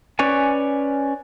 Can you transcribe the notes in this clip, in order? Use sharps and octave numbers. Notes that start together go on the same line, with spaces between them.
C#4 B4 C#5 D5 G#5